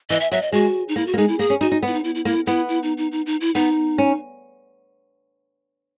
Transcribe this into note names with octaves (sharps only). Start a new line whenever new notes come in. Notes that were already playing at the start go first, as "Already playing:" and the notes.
E3 D#5
E5
F#3 E5
D#5
G#3 F#4
D#4
A#3 E4
F#4
A#3
G#3 D#4
E4
A#3 G#4
C#4
D#4 F#4
D#4
B3 E4
D#4
E4
E4
A#3 E4
B3 E4
E4
D#4
D#4
D#4
D#4
E4
B3 D#4
C#4